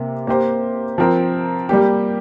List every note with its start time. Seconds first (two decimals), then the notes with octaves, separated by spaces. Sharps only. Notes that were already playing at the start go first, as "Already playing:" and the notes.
Already playing: C3 A#3
0.27 A#3 G4 C5
0.98 F3 C4 A#4
1.69 G3 A#3 G4